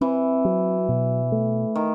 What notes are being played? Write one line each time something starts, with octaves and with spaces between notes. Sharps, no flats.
E3 C4
F#3
B2
A3
D#3